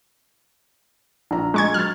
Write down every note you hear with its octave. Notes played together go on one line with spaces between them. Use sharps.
A#1 A#5
G#3 C#6 G#6
F#3 F6 A6